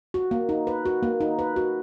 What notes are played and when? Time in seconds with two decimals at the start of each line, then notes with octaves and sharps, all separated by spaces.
0.14 F#4
0.31 A#3
0.49 D#4
0.67 B4
0.86 F#4
1.03 A#3
1.21 D#4
1.39 B4
1.56 F#4